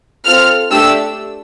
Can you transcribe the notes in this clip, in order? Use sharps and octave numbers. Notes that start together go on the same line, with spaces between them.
C4 F4 A4 F6
A3 D4 G4 E6